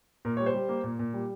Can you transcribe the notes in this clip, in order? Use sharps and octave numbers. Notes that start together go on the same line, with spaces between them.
A#2 A#4
G3 C#5
C5
G3
A#3
A#2
A#2
G3